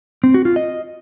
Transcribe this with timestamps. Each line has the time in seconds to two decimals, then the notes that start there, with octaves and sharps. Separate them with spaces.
0.24 C4
0.34 F#4
0.45 F4
0.56 D#5